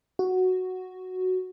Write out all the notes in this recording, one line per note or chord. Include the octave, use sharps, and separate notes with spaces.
F#4